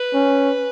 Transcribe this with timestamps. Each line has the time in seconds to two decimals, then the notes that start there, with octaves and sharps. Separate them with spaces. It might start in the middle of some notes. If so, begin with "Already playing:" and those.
Already playing: B4
0.14 C#4